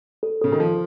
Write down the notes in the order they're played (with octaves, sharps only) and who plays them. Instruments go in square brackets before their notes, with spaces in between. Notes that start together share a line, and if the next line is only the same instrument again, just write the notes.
[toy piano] A4
[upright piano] C#3 [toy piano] A4
[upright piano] D#3
[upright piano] F3 [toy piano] A4